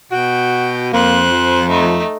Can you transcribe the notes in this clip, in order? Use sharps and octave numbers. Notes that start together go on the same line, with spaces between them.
B2 F#4 G5
F2 A#3 C5 F#6
F3
A3 D#4